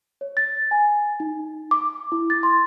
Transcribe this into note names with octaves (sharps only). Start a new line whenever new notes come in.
C#5
A6
G#5
D#4
D6
E4
A6
C6